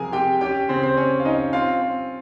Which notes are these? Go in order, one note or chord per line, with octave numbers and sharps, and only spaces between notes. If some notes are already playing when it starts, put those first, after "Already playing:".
Already playing: C3 F3 G#4 A#4 G#5
C3 G4 G5
C#4 G4 G5
C#3 C4 C5
C4 C5
C#4 C#5
F5
C#4 D#4 D#5
C4 F4 F5
C4